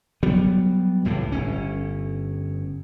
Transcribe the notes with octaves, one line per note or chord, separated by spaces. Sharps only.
F#3 G3 B3
C#2 A2 C3 E3
G1 C#4